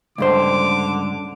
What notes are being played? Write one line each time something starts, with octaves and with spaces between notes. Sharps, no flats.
C#2 G2 D3 C5 D6